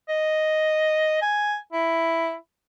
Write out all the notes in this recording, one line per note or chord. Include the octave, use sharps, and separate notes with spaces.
D#5
G#5
E4